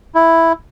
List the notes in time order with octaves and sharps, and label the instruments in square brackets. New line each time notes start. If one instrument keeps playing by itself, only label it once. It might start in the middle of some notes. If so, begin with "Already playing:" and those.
[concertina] E4